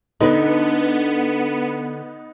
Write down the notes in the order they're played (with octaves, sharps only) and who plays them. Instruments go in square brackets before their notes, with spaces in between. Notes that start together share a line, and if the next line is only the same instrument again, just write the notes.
[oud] D3 B4 [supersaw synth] B3 [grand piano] D#4